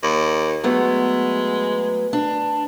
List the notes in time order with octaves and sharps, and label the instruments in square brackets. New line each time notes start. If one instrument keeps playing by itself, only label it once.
[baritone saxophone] D#2
[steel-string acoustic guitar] F#3 A3 B3 [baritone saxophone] G#3
[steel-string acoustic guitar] D4